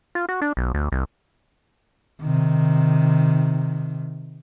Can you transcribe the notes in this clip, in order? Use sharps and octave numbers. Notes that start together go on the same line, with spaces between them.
F4
F#4
D4
B1
D2
C2
C3 D#3